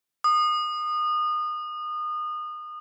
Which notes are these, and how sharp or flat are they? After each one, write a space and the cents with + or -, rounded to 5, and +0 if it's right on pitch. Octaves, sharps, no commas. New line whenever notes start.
D#6 -30